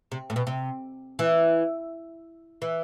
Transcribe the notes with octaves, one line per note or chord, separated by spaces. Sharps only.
C3
A2
B2
C3
E3
E3